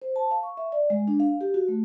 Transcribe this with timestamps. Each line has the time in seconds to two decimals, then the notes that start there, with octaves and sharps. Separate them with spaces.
0.02 C5
0.16 A5
0.31 F5
0.43 C#6
0.57 E5
0.72 D5
0.90 G#3
1.08 D4
1.20 F5
1.41 G4
1.54 F#4
1.68 A3